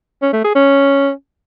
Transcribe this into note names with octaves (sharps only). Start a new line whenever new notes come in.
C#4
A3
G#4
C#4